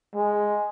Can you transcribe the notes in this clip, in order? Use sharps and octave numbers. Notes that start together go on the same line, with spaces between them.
G#3